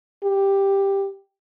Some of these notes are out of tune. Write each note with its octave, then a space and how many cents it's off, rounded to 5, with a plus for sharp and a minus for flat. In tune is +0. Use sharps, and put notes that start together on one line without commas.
G4 +5